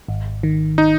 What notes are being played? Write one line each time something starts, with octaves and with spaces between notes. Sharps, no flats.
G#1
D#3
D#4